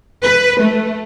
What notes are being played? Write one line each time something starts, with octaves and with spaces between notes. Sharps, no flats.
B4
A3